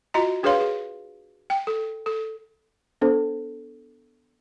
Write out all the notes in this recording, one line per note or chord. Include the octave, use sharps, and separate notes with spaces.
F4 F#4 D#5 A#5
D4 G#4 B4 C#5 F5 C6
G#4
G5
A4
A4
B3 D4 A4 C5